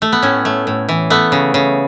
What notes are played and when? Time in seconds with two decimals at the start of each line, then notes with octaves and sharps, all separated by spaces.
0.02 A3
0.12 B3
0.22 A2 C#4
0.45 A3
0.67 A2
0.89 E3
1.10 A3 B3
1.32 C#3
1.54 C#3